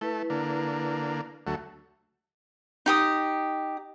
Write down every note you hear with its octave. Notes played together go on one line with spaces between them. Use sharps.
A3 E4 B4
D3 A#3
D2 F#3 A3
D#4 G4 D#6